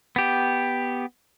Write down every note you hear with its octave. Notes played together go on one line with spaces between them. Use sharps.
B3 G4